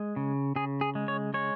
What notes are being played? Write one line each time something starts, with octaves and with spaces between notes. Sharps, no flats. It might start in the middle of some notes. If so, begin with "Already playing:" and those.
Already playing: G#3
C#3
C#3 G#4
G#4
G#3
C#5
G#3 C#5